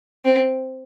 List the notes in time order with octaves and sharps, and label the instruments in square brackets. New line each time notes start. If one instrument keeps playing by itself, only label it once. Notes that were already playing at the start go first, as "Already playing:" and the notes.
[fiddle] C4